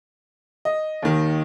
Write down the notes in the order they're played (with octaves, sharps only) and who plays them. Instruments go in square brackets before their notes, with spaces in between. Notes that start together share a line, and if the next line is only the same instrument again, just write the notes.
[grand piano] D#5
D#2 D#3